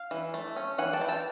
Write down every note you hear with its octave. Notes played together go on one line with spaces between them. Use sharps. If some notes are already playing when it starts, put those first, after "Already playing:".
Already playing: F5
E3
A3
C#4
E3 F#5 G#5
G5 A5
E3
G5 A5